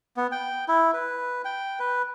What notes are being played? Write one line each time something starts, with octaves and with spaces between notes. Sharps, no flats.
B3
G5
E4
B4
G5
B4